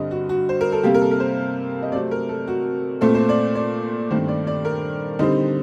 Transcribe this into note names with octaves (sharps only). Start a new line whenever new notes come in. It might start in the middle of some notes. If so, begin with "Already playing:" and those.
Already playing: G2 D3 G3 C4 D#5
F#4
F#4
C5
A#4
A4
C3 G3 A#3 G4
A#4
A4
A#4
C5
D#5
C3 F#3 A3 C4 D5
A#4
A4
F#4
A#2 A3 C4 A4
C5
D5
D5
G2 D#3 A3 C4 C5
D5
D5
A#4
D3 G3 C4 D#4